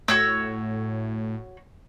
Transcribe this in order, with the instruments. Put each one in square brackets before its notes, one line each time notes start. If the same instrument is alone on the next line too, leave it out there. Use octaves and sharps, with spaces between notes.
[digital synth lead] A2 [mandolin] F#4 C#5 E6